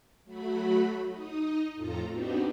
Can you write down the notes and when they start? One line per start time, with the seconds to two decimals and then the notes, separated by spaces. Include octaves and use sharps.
0.25 F#3 A3 F#4 B5
1.08 D#4 D#5
1.75 F2 A2 F4 A4 A#5
2.10 B3 C4 D4 D#4 F#4 G4